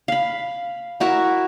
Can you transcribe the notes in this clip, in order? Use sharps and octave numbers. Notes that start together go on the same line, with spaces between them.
F5 B5
E4 F#4 A#4 E5